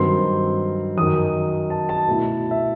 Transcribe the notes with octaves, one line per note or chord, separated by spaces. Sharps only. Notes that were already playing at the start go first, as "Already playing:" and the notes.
Already playing: G2 D#3 F#3 C4 C6
F#2 D#3 F#3 D#6
A5
A5
B2 A3 E4
E5